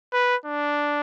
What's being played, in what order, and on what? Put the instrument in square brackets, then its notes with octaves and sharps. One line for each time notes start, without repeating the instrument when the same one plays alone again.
[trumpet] B4
D4